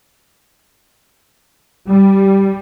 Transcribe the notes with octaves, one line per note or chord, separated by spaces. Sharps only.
G3